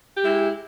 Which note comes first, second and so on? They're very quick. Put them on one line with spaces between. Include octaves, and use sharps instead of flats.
G4 G#3 E4